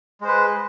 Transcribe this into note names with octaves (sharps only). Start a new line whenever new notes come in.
G#3 B4 C5